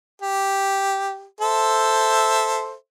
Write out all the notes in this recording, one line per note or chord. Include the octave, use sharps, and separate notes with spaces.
G4
A4 C5 E5